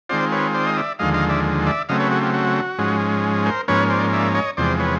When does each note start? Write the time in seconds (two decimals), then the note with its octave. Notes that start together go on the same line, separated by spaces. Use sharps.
0.09 D#3 G#3 C4 F4 C5 D5
0.32 B4 C#5
0.54 C5 D5
0.67 D#5
0.77 D5 E5
0.99 D#2 D3 F3 G#3 D#5 F5
1.14 D#5 F5
1.29 D5 E5
1.67 D5 E5
1.89 C#3 F#3 A3 C4 D#5 F5
2.00 B4 C#5
2.11 F#4 G#4
2.22 F4 G4
2.34 F#4
2.79 G#2 F3 G#3 C#4
3.46 A#4 C5
3.68 G#2 F3 A#3 C#4 B4 C#5
3.90 C5 D5
4.13 D5 E5
4.35 C#5 D#5
4.57 E2 C3 F3 G#3 C5 D5
4.80 B4 C#5